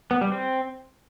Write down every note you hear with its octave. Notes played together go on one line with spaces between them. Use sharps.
B3
G3
C4